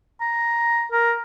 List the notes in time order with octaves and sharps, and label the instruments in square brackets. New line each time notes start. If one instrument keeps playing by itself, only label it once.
[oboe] A#5
A#4